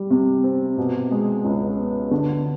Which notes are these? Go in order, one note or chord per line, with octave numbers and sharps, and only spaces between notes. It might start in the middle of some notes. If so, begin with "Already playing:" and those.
Already playing: G3
C3
C4
B2
G#3
C#2
B3
D3